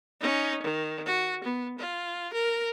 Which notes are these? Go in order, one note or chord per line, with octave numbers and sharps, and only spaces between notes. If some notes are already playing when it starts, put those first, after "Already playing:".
C#4 D#4
D#3
F#4
B3
F4
A#4